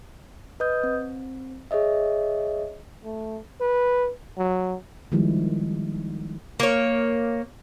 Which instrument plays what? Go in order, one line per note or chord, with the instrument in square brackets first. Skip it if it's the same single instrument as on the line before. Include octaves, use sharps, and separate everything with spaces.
[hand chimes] B4 D#5 D#6 G6
C4
G#4 C#5 D#5 E5
[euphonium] A3
B4
F#3
[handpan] D#3 F3 G3 G#3 B3 E4
[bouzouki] A#3 C#5